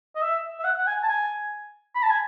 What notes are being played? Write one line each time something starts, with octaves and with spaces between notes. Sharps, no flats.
D#5
E5
E5
F#5
F#5
G#5
A5
G#5
B5
A5
G#5